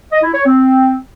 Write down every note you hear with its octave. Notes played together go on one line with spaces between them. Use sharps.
D#5
E4
C#5
C4